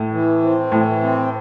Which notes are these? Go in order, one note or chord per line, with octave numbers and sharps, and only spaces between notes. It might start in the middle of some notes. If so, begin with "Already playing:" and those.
Already playing: A2
E3
C4
A2 E3
C4